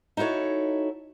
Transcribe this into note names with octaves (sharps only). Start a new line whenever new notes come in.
D#4 E4 F#4 A4 C#5